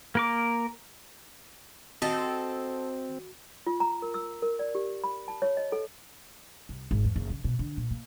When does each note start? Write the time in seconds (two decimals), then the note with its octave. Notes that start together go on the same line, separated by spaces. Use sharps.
0.15 A#3 A#4 D6
2.02 C4 F#4 A4 D#5
3.67 F4
3.80 A#5
4.02 A#4
4.14 E6
4.42 A#4
4.59 D5
4.75 G4
5.04 B5
5.28 A5
5.42 C#5
5.57 D#5
5.72 A4
6.69 C2
6.91 G#1
7.04 E2
7.16 F#1
7.30 C#3
7.44 B2
7.59 D3
7.77 A#2
7.91 A#3